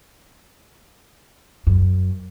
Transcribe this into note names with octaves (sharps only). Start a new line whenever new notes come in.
F#2